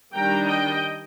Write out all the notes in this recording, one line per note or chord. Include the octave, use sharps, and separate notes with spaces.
D#3 G3 D4 G5 A#5
D#5 G5